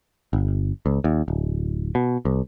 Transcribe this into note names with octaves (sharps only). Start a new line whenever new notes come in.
G1
C#2
D#2
D1
B2
C2